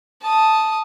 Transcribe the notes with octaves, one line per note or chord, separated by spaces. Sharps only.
A5 D#6